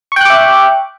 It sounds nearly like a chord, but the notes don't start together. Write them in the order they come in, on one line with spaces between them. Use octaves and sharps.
C#6 G5 F#6 D6 E5